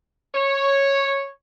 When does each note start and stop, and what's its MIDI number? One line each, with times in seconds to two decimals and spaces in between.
0.34 1.28 73